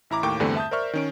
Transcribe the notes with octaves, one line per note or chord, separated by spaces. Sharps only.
A1 E4 A#5 D6
D#2 A2 A#3 G5 C#6 D6
E2 G2 D3 G3 A3 C4
E5 A5 D#6 G6
A#4 C5 D5 E5 C#6 F6
D#3 C#4 D7